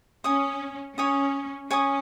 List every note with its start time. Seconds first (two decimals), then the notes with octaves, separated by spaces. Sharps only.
0.24 C#4 C#5 G#5 D#6
0.97 C#4 C#5 G#5 D#6
1.70 C#4 C#5 G#5 D#6